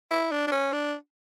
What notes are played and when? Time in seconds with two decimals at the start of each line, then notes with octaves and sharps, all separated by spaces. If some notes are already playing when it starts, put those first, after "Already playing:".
0.11 E4
0.32 D4
0.47 D4
0.52 C#4
0.73 D4